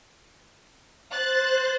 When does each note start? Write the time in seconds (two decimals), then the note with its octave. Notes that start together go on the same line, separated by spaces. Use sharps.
1.10 C5 F#6 A6